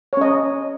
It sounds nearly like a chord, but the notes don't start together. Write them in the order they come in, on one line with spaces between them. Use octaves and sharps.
C#5 C#4 D#5